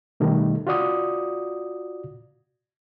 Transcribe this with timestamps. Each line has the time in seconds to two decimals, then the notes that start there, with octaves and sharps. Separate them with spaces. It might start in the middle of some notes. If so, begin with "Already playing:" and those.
0.20 B2 D#3 G3 A3 D#4
0.67 F4 F#4 D5 D#6